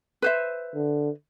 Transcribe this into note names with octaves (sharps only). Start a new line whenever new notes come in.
B4 C5 E5
D3